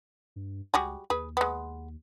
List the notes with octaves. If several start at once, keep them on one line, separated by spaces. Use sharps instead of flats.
G2
C#2 G3 F#4 G#4
D#2 G#4 B4
G#3 B3